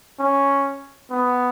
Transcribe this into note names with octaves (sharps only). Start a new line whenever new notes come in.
C#4
B3